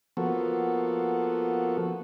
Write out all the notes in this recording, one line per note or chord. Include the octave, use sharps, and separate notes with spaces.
F3 A#3 B3 F#4 A4